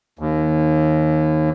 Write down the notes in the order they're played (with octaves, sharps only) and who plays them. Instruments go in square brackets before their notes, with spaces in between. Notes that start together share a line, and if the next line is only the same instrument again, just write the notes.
[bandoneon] D#2